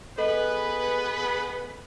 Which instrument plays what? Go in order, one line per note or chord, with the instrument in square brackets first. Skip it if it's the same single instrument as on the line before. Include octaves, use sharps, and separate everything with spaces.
[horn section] B3 G#4 B4 [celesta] A4 D#5